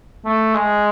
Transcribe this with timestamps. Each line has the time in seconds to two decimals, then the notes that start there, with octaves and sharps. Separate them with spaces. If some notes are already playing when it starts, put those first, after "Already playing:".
0.25 A3
0.54 G#3